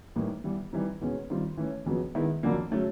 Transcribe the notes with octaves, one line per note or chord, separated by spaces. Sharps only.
A2 E3 G3 A#3 D#4
E3 G3 B3
E3 G3 C4 D#4
E2 B2 G#3 C#4
D#3 G3 C4 F4
E3 A3 C#4
F2 C#3 F#3 B3
D#3 G#3 B3 E4
F2 D3 F#3 A#3 D4
C#3 F#3 A3 C#4